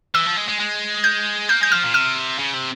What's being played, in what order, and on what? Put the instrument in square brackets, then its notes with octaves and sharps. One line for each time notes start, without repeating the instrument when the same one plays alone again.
[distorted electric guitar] E3 [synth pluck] E6
[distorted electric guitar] F3
G#3
G#3
G#3
[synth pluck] G6
[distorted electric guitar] A#3 [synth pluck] G6
[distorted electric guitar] G#3 [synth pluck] G6
[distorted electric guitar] F3 [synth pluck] F6
[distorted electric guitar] A#2
[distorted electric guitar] C3 [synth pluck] F6
[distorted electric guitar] C#3
C3